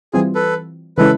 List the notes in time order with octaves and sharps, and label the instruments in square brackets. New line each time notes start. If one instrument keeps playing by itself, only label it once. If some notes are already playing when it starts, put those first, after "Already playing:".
[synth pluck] E3 G3 C4 F4 [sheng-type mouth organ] G#4
[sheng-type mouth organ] A4 B4
[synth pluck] C#3 E3 G#3 C#4 E4 [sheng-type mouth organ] A4 B4